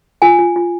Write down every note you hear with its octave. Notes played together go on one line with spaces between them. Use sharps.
F4 G#5
F4
F4